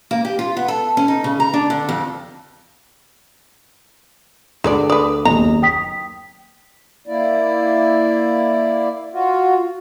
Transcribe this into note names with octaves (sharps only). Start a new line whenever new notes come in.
A#3
G4
F4
B3
A4
C#4
D#4
C#3
A#5
D4
D3
F2
D2 G#3 B3 D5
B4 D5 D6 D#6
F#1 D#2 A#5
G5 D#6 B6
A#3 E4 D5
F4 F#4